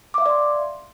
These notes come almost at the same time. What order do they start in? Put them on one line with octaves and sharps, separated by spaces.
D6 E5 F5 D5 C6